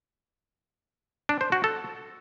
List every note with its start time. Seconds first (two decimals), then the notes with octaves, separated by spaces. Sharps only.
1.29 D4
1.41 C5
1.52 F#4
1.64 A4